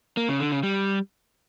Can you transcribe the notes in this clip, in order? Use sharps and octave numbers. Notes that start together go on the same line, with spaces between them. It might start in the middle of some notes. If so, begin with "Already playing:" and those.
A#3
C#3
D3
C#3
G3